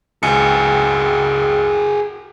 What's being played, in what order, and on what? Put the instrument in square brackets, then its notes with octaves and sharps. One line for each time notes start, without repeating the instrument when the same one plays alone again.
[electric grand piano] G#1 C#2 C#7 [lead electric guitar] F#4 G#4